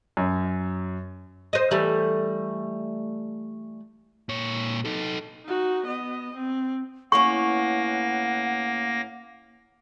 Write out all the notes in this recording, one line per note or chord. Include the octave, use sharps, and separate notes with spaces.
F#2
C5 D#5
E3 G3 A3
A#2 C#5
D#4 A4
D#4 F#4
B3 D#5
C4
A2 A#3 B3 C#4 F#5 C#6 A#6